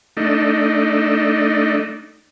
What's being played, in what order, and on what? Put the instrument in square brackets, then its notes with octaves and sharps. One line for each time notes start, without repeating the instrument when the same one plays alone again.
[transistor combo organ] A3 D4 D#4